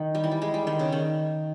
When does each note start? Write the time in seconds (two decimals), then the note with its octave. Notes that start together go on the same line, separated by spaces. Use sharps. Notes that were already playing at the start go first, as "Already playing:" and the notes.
Already playing: D#3
0.15 G3
0.24 E3
0.31 G3
0.42 G#3
0.54 G3
0.67 D#3
0.79 C#3
0.92 D#3